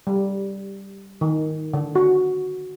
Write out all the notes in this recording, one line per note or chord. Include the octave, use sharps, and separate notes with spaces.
G3
D#3
D3
F#4